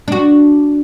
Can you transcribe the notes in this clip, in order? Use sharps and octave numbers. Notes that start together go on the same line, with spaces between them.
D4 F#4